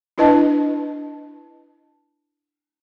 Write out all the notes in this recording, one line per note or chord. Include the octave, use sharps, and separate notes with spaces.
D4 E4 B4 D#5 A5